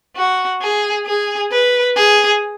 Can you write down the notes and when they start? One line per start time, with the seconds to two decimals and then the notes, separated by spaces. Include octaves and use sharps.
0.16 F#4
0.62 G#4
1.07 G#4
1.52 B4
1.96 G#4